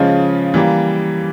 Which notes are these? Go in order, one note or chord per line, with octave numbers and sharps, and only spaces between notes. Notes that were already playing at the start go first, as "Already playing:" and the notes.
Already playing: C#3 F3 G#3 C#4 F4
E3 G3 A#3